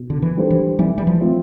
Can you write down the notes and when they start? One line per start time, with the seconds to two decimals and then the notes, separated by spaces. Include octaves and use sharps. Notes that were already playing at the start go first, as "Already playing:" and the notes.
Already playing: B2
0.10 D3
0.22 E3
0.37 G3 D4 A4 C5
0.50 E3
0.79 E3 G3
0.98 G3
1.07 F3
1.21 A3 C4 F4